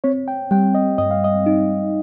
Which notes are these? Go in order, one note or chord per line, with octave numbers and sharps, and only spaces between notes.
C4 C#5
G5
G3 G5
D#5
G2 D#5
F5
D#5
D#4